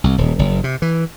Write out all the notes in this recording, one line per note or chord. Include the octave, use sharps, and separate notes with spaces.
C2
D#1
F#1
C3
E3